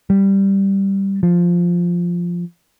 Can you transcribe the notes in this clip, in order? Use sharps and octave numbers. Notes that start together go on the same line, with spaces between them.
G3
F3